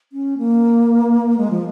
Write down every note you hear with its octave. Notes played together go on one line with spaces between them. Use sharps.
C#4
A#3
G#3
F3